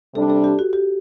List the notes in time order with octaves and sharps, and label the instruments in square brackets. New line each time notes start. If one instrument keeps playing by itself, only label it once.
[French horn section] C3 G3 D4 [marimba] A4
[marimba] A4
G4
F#4
G4